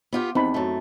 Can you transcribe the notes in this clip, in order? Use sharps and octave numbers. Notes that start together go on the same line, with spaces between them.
B3 F4 G4
E2 C4 D#4 B5
F#2 A3